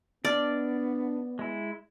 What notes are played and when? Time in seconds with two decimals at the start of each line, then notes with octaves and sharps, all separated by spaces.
0.25 B3 D4 D5 D#5 F6
1.39 G#3 E4